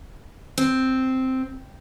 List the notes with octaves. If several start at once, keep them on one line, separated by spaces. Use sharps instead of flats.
C4